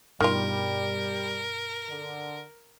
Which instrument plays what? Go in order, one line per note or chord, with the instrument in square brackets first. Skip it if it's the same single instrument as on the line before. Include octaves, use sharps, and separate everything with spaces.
[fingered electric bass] G2 B2 [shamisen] D#3 F4 [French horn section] G3 [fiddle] A#4
[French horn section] D3